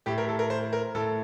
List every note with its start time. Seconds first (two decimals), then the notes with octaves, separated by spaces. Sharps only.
0.06 A2 G4
0.18 A#4
0.29 A4
0.39 A#4
0.50 C5
0.73 A#4
0.95 A2 A4